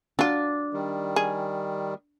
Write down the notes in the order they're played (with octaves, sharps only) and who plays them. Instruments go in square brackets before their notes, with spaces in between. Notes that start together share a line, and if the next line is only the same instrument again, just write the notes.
[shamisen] F#3 F4 [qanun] D4
[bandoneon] D#3 G3
[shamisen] G#4